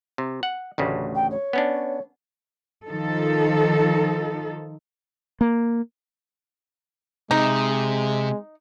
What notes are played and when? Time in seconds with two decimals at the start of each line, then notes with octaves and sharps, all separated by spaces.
0.18 C3
0.43 F#5
0.78 A1 D2 C#3
1.15 G5
1.30 C#5
1.53 B3 C#4 D4
2.88 D#3 F3 D#4 A4
5.41 A#3
7.31 C3 G#3 D#4